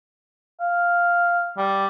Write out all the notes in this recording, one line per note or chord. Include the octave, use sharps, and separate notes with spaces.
F5
G3